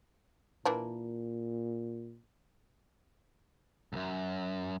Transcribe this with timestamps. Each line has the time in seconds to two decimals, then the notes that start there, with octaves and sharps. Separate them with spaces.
0.65 A#2 E3 A#3 D4
3.93 C#2 F#2